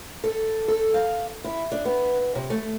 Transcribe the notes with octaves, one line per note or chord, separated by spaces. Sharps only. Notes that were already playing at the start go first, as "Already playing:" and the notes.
A4
A4
F5
E4
D4
B3
C3
A3